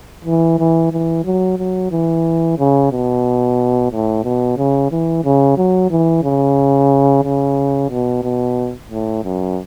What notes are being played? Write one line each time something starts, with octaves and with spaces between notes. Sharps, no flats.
E3
E3
E3
F#3
F#3
E3
C#3
B2
A2
B2
C#3
E3
C#3
F#3
E3
C#3
C#3
B2
B2
A2
F#2